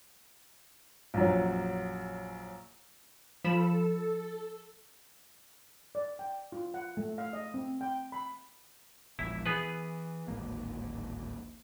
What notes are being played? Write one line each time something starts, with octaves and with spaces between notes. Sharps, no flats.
A#1 F#2 F#3
F3 A4 B5 E7
D5
G5
F4
F#5
A3
F5
D#5
C4
G5
B5
E1 A#1 E4
E3 B3 G#4 B4
D1 G#1 A#3